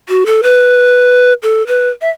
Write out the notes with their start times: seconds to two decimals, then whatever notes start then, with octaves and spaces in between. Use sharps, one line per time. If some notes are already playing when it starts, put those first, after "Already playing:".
0.09 F#4
0.26 A4
0.43 B4
1.43 A4
1.67 B4
2.01 E5